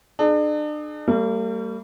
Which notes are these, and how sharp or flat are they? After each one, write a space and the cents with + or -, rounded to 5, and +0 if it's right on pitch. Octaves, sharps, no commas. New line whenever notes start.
D4 +40 G#4 +30
G3 +0 A#3 -45